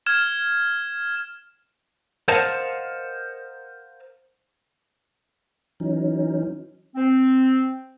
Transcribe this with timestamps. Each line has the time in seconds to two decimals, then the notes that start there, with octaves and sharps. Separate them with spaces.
0.06 F6 G#6 E7
2.28 A#4 C5 D#5 F5 F#5 A5
5.80 E3 F#3 C#4 D#4
6.96 C4